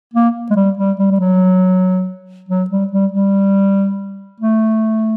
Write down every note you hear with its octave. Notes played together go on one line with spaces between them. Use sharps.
A#3
G#3
G3
G3
G3
G3
F#3
F#3
G3
G3
G3
A3